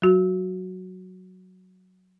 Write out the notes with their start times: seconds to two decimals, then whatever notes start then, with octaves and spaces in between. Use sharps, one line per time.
0.02 F#3 F#4